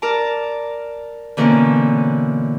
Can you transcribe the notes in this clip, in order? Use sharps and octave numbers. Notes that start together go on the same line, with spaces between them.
A#4 D5 A5
B2 D3 E3 A#3 C4 C#4